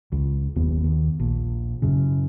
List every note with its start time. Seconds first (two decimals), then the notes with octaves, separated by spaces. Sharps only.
0.12 C#2
0.56 F#1 D#2 B3
0.84 D#2
1.20 A#1
1.82 F#2 C#3